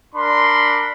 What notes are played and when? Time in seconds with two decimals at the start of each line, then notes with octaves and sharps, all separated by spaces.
0.15 D4 A#4 B5 C6